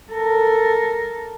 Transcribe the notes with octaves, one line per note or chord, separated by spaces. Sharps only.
A4 A#4